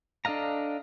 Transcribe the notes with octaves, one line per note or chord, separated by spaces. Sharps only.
D4 A4 D#5 F5 A#5